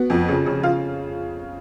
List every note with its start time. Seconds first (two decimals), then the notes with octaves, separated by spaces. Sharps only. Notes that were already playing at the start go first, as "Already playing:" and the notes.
Already playing: B3 F#4
0.10 F2
0.28 C#3
0.46 C#3
0.63 F4